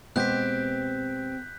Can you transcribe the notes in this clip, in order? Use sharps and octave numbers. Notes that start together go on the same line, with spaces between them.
B2 G#3 B3 C4 G4 F#6 G6 B6